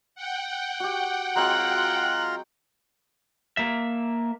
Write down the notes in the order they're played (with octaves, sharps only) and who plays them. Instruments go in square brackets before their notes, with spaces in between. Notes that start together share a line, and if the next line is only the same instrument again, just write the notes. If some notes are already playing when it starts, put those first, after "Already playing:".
[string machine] F#5 G5
[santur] F#4 G4
[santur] F#3 G#3 C4 [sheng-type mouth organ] F4 A#5 C6 [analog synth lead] F#6
[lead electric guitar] A#3 E5